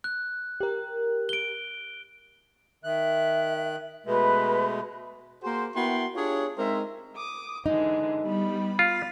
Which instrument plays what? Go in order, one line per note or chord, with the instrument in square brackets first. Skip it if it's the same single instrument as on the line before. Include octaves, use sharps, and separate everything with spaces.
[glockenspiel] F#6
[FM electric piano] G4 A#4
[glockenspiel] D7 G7
[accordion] D#3 F#6 [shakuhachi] E5
[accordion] B2 G#3 A3 [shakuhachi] B4
[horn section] A#3 F#4 G#4 C5
B3 E4 F#4 A#4 G5 C6
D4 F4 G4 G#4 C#5
G#3 C4 D#4 A#4 C5 E5
[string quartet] D6 D#6
[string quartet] D3 E3 G#3 [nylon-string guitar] D#4
[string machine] G3 [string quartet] B3 B5
[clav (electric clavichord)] F4 [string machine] A6 B6